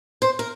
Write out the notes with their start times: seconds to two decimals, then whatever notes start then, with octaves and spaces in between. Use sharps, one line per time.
0.22 C5
0.39 A#4